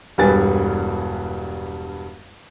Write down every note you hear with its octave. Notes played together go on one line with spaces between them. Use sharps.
E1 G2 G3 B4 G#5 A6